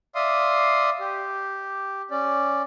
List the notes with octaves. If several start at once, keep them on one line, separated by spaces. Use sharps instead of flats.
D5 E5 F5 C6 D#6
G4
C#4 D5